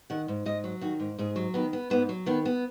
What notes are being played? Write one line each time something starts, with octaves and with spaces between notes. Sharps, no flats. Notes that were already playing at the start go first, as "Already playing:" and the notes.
D#3 F#5
G#2
G#2 D#5
F#3
D#3 F#4
G#2
G#2 G#4
F#3
D#3 B3
B3
G#2 B3
F#3
D#3 B3
B3